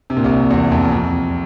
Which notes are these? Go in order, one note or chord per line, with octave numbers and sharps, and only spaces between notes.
C3
A#2
C2 C3
E2
F2
F2